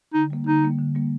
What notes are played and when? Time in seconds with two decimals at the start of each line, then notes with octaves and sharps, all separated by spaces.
0.14 D3 D#4
0.30 G3 A#3
0.46 D3 D#4
0.63 G3 A#3
0.79 D3
0.95 G3 A#3